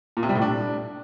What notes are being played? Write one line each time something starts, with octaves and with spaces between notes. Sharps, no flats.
A#2
C3
G3
A2
D4